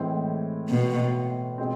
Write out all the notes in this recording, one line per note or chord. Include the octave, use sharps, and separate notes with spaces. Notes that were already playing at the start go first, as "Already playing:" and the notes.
Already playing: A2 E3 G#3 C4 E4
B2
B2 G#3 C4